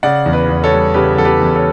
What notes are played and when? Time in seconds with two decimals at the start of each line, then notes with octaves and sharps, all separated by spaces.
0.03 C#3 D5 F#5
0.26 E2
0.33 B4 D5
0.49 E2
0.64 A4 C#5
0.72 G3
0.94 C#3 G4 B4
1.17 E2 A4
1.25 G4 B4
1.41 E2
1.56 A4 C#5